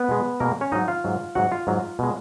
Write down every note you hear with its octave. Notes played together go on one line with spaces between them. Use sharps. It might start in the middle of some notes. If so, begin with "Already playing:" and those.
Already playing: B3 B4
B2 G#3
B2 G#3 A#3 A#4
C#4 C#5
G#2 F#3 D#4 D#5
F4 F5
G#2 F#3
G#2 F#3 F#4 F#5
F4 F5
G#2 F#3
B2 G#3